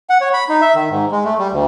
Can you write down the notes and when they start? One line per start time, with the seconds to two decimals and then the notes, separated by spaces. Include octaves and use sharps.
0.10 F#5
0.21 C#5
0.34 B5
0.49 D#4
0.61 E5
0.75 D#3
0.90 G#2
1.11 G#3
1.24 A3
1.38 G3
1.51 D2